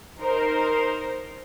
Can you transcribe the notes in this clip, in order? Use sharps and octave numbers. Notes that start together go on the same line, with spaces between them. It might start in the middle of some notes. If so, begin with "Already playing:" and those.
D#4 A#4 C5